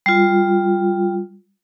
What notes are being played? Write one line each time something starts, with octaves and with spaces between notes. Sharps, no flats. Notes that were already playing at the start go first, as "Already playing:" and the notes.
G3 F4